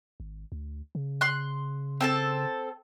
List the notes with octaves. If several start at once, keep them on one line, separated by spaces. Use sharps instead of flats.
G#1
D2
C#3
C6 F#6
C4 A4 A5